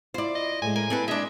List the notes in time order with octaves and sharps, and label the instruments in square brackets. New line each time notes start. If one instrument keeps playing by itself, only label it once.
[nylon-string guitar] E4 F4 [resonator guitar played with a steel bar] C5 D5
[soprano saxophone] D#5
[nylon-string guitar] A2 G#3 [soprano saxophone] G#5
[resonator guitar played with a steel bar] A#4 [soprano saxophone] G#5
[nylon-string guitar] A#3 [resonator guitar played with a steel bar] C4 A4 B4
[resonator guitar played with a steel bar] G#3 D4 [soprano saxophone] E5